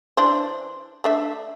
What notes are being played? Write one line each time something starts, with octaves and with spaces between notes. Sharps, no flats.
E3 D4 C5
A3 D4 E5